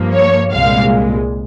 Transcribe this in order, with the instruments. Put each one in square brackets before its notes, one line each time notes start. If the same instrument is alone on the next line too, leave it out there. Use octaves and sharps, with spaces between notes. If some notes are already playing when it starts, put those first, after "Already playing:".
Already playing: [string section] G2 F3 A#3
C#5
C2 A#2 G#3 F5